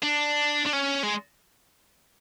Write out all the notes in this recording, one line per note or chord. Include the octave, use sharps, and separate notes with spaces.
D4
D4
C#4
G#3